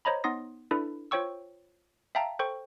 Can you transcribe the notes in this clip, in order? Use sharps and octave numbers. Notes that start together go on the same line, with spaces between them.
C5 C#5 D#5 A#5 B5
B3 D#4 C6 D#6 A#6
D4 E4 A4 B4
F4 C5 C#5 G5 C#6 E6
E5 F5 G5 A5 A#5
A4 C5 G5 C#6